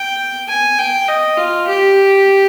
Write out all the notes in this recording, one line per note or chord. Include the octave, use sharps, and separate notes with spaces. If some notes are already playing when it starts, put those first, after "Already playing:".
Already playing: G5
G#5
G5
D#5
F4
G4